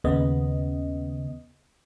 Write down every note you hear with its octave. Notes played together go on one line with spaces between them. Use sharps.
D#2 C#3 B3 D#5